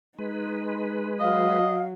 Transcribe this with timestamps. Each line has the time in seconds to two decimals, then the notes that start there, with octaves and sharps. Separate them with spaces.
0.19 G#3 D#4 B4
1.20 F#3 D#5 F5